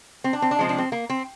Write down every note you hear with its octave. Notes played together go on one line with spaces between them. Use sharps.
C4
D4
C4
D4
C3 F3 G#3 C4
D4
C4
A#3
C4